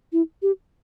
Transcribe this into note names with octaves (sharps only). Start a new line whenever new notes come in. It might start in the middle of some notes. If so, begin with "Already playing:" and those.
E4
G4